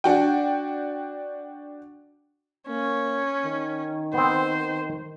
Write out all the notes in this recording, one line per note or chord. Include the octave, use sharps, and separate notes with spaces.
D4 F#4 G5
A#3 C#4
D#3
B3 C4 C5